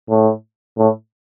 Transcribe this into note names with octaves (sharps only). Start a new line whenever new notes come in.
A2
A2